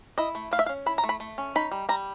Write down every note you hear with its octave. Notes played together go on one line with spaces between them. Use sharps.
E4 D#5
A3
A3 F5
E5
F5
C#4
E4 B5
A#5
A3
B5
A3
C#4
D#4 B5
G3
G3 A#5